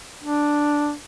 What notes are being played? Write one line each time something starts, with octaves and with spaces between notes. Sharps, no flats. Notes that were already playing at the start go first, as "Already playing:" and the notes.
D4